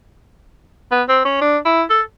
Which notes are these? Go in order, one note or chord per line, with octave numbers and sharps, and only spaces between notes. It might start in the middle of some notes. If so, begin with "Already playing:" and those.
B3
C4
C#4
D4
E4
A4